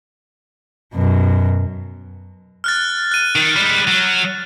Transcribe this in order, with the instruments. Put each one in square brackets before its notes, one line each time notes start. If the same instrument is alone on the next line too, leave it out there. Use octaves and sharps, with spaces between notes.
[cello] F#2 B2
[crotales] F6 F#6 A6
F#6 D#7
[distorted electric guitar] D#3
G3 G#3
F#3